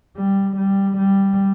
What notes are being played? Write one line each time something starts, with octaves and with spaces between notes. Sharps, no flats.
G3
G3
G3